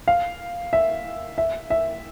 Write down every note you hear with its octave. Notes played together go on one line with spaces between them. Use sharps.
F5
E5
E5
E5